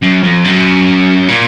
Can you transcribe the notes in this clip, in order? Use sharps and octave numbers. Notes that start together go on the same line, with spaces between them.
F#2
F2
F#2
A#2